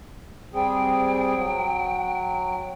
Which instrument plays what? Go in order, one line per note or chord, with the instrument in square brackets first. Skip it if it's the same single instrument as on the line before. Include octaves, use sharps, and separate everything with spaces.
[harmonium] G3 C4 G#4 [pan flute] G5
[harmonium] F#3